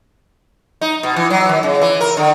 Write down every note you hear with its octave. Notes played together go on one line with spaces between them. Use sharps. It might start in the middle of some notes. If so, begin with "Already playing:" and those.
D#4
B2
E3
F#3
D#3
C#3
E3
A#4
D3